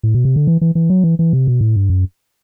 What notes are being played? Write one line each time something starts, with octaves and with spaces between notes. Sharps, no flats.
A2
B2
C3
D3
E3
E3
E3
F#3
E3
E3
C3
B2
A2
G2
F#2